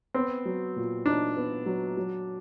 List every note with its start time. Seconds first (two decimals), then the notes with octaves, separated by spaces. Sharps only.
0.14 B3 C4
0.45 F#3
0.76 A#2
1.06 D4 D#4
1.37 B3
1.66 F#3
1.97 F#3